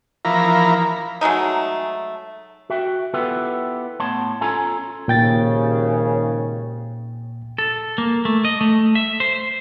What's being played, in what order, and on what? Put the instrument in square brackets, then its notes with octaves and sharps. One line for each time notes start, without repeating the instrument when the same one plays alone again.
[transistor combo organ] E3 F3 A#4 A#5 B5
[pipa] F#3 G#3 A3 D#4
[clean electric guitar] F#4 E5 G5
B3 E4 F4 G4 A4 B4
A2 B3 C#5 A5 C6
C#4 F4 A4 C#5 G#5 A#5
[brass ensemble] G#1 D#2 C#3 [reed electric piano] A#2 G5 A6
[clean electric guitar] A4
A#3
A3
D#5
A3
E5
C5